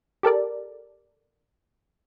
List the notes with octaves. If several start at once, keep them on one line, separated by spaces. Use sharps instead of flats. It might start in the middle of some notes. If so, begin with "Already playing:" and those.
G4 A4 A#4 D5